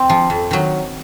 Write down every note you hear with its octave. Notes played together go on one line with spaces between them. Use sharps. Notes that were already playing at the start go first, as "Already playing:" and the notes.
Already playing: C4
F3
F2
D#3 F#3